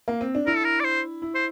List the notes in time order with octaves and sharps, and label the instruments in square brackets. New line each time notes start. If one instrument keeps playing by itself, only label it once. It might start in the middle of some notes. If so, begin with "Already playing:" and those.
[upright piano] A#3
C4
D4
[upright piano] E4 [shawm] A#4
[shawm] A4
A#4
D5
C5
[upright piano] E4
[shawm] C5